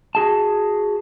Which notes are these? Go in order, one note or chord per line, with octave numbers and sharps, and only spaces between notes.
F#4 G#4 A5